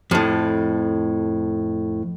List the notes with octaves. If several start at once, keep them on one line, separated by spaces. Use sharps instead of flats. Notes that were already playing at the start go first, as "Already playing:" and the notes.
F2 A2